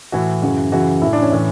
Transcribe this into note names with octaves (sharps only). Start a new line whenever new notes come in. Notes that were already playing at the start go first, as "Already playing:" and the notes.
A2 E3 F#4
F#2 C#3 E3 F#4
F#2 C#3 E3 F#4
A2 E3 E4
D4
C#4
A2 E3